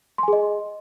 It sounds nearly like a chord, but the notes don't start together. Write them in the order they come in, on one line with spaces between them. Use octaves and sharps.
C6 G#5 G#4 D#5